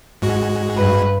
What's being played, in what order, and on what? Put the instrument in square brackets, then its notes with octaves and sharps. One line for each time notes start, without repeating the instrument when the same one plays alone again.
[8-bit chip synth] G#2 G#3 F#4
[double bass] G2 [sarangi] B4